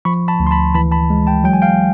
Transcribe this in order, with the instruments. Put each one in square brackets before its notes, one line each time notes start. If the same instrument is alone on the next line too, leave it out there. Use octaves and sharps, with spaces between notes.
[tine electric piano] F3 B5 C#6
A5 B5
D2
C6
A5 B5
E3 A5 B5
A5 B5
G#3
G5 A5
F#3 G5
G#5
F5 G5